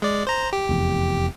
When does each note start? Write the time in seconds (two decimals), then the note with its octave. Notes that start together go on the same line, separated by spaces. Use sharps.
0.02 G#3 D5
0.27 C5 A#5
0.53 G4
0.69 F1 E2